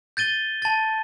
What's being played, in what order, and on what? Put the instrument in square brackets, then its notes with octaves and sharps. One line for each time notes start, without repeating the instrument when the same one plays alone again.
[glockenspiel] G6 A6 D#7 G7
A5 A6